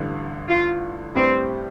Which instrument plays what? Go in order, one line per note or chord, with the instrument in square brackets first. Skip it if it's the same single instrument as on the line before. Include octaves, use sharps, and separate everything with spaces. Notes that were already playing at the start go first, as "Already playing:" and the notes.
Already playing: [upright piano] A1 G2 D3
[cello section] F4
[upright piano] A2 G3 D4 G4 B4 [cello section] C4